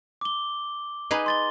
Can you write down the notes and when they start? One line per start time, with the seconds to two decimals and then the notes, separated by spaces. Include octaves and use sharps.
0.21 D6 G7
1.11 D#4 G#4 B4
1.26 C6 A6 G7